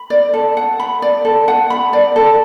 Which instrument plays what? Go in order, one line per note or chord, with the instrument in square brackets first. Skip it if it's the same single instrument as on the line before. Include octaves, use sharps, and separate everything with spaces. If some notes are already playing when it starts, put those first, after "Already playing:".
Already playing: [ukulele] B5
D5
A4
F#5
B5
D5
A4
F#5
B5
D5
A4